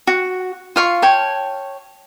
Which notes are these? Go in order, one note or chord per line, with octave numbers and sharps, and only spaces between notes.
F#4
F4 F5 C#6
C#5 G5 A5